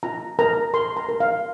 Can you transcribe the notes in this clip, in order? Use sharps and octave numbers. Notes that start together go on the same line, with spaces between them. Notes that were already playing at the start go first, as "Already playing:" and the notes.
F4 A#5
A#4 A#5
A#4 C6
A#5
A#4
F5